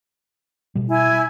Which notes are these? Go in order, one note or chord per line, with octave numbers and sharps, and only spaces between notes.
B2 G3
E4 G#5